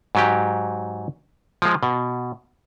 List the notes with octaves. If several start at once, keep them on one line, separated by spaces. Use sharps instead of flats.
G#2 F#3 G4
F3 G#3
B2